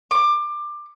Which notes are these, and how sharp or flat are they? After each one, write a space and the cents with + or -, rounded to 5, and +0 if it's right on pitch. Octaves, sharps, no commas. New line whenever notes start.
D6 +20